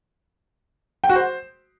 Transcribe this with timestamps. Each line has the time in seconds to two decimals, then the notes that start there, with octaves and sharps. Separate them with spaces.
1.04 G5
1.09 F#4
1.15 C5